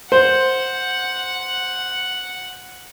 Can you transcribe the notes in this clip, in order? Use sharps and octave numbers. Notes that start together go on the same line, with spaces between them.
C5 F#5